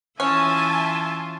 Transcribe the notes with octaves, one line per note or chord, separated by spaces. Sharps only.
E3 C#4 F4 E5 G#5 A5